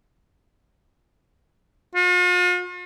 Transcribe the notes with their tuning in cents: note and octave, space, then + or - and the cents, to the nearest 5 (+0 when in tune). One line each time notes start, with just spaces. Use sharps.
F4 +45